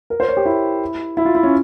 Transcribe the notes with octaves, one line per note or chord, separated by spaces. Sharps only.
A#4
C5
C#5
G4
E4
E4
F4
E4
C#4